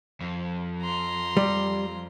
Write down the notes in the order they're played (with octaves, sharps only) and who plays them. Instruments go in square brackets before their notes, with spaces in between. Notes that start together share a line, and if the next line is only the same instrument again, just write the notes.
[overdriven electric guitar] F2
[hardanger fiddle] A#5 C6
[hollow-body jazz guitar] G3